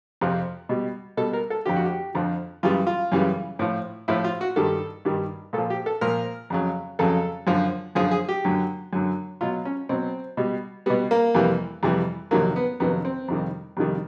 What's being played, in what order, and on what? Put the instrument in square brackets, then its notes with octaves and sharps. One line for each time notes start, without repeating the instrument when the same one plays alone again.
[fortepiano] F2 C3 F3
B2 G3
B2 G3 A4
A#4
A4
F2 D3 F3 G4
F#4
G4
F2 D3 F3
F#2 C#3 E3 G3 F4
F4
F#2 C#3 E3 G3
A2 F3
A2 F3 E4
F4
F#4
G2 D#3 G3 A4
G2 D#3 G3
A#2 A4
F3
G4
A4
A#2 F3 A#4
F2 C#3 F#3
F2 C#3 F#3 A4
F#2 D3 F3
F#2 D3 F3 G#4
G#4
G4
F#2 D3 F#3
F#2 D3 F#3
B2 F#3 F4
C#4
B2 F#3 C4
B2 G3
G3 B3
B2
A#3
F2 C3 E3 G3
F2 C3 E3 G3
F2 C3 D#3 F#3 A#3
B3
F2 C3 D#3 F#3 B3
C4
F2 C3 D#3 G3
F2 C3 D#3 G3